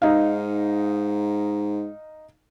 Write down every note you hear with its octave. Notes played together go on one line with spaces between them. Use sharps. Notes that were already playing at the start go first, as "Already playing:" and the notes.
G#2 D#4 F5